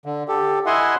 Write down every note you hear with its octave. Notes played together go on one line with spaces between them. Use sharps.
D3
G4 A4
E4 D#5 E5 F#5 G#5 C6